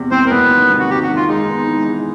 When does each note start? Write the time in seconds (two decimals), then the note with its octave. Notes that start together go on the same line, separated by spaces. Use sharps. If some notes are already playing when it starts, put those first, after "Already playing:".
Already playing: E2 C3
0.11 E3 C4 C5
0.26 A#4
0.30 F#1 B3 B4
0.51 D#3
0.70 C3
0.80 F#4
0.90 D#3 G4
1.03 F#4
1.09 D#3
1.16 F4
1.29 G#3 D#4
1.48 B3
1.68 E3
1.88 G#3